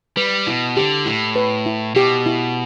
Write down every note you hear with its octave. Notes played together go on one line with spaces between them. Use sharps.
G3 B4
B2 E4
D3 G4
A2 E4
B4
E4
B2 G4
E4